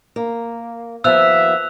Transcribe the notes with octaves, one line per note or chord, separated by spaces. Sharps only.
A#3
D#2 F3 B3 E5 E6 F#6 F7